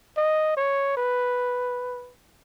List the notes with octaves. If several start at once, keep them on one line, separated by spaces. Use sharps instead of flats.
D#5
C#5
B4